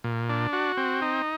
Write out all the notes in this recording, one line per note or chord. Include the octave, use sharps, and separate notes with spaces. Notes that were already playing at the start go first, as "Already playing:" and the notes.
A#2
D4
F#4
C4
D#4